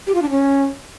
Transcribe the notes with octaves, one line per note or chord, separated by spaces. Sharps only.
G4
F4
D4
C#4